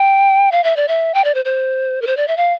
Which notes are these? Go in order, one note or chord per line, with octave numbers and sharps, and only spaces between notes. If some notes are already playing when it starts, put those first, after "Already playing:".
Already playing: G5
F5
E5
D5
E5
G5
D5
C5
C5
A#4
C5
D5
E5
F5